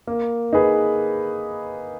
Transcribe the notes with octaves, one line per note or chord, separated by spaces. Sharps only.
A#3
D#4 G#4 B4